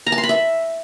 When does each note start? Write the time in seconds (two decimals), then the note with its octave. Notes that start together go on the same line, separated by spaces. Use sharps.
0.07 A#5
0.12 A5
0.18 C6
0.23 B5
0.29 E5